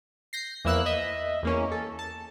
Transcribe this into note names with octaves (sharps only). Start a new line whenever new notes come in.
G6 A#6 C7
E2 F3 A#3 E4 E6 F#6
D#5 E5
E2 A#3 C#4
A4
A5